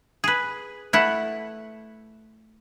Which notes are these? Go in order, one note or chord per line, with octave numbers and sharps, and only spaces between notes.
G#4 B4
A3 E4 B4 F#5